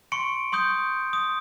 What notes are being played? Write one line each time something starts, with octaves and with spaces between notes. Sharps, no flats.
C6 C#6 C#7 D7
C6 C#6 D#6 G6
D#6